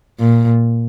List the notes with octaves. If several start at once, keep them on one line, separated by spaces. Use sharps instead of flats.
A#2